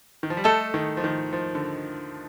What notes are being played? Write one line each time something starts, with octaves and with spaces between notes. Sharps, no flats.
D#3
F3
G3
A3 A4 D#5 A5
D#3
F3
D#3
F3
D3